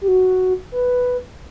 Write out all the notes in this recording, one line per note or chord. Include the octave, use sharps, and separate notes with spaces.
G4
F#4
B4